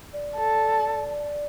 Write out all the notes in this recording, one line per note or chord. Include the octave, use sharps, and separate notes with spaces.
D5
A4